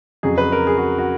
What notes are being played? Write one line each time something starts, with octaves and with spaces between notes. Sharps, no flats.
F2 C#3 F#3 G#4
B4
A#4
G#4
F#4
F#4